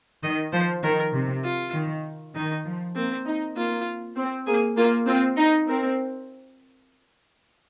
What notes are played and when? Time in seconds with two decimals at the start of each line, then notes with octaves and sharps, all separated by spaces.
0.23 D#3 D#5
0.52 F3 C5
0.83 D#3 A#4
1.14 C3
1.44 F4
1.74 D#3
2.35 D#3 D#4
2.65 F3
2.95 A#3 C4
3.26 D#4
3.56 A#3 F4
4.16 C4
4.47 A#3 G#4
4.77 A#3 F4
5.07 C4 F4
5.37 D#4
5.68 C4 A#4